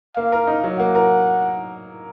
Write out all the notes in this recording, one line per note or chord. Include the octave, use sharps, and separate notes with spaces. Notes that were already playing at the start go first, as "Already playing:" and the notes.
A#3 F5
A#4
D#4
F#3
A#3 F#5
A#4